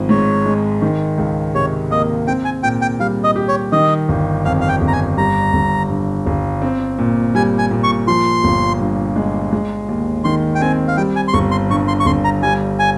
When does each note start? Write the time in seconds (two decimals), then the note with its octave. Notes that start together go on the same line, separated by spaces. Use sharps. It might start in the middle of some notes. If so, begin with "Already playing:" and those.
Already playing: G#1 F3
0.09 G#2 C#5
0.46 G#3
0.82 D#3
1.18 C#2
1.54 C3 C#5
1.91 A#3 D#5
2.27 C4 G5
2.45 G#5
2.63 A#2 G5
2.82 G5
3.00 G3 F5
3.24 D#5
3.36 G4
3.48 C#5
3.72 D#3 D#5
4.09 G1
4.45 F2 F5
4.61 F5
4.69 G5
4.81 G1
4.88 A#5
4.93 G#5
5.17 G3 A#5
5.53 G1
5.90 G2
6.26 G1
6.62 C4
6.98 A#2
7.35 G3 G#5
7.58 G#5
7.71 A#2
7.84 C#6
8.07 F3 C6
8.44 G1
8.80 G2
9.16 G#3
9.53 G#3
9.89 D#2
10.24 D#3 C6
10.55 G5
10.61 C4 G#5
10.88 F5
10.97 G3 G5
11.16 G#5
11.28 C6
11.34 G1 C#6
11.51 C6
11.70 G2 C#6
11.88 C6
12.00 C#6
12.06 G1 C6
12.24 A#5
12.43 G3 G#5
12.79 G#5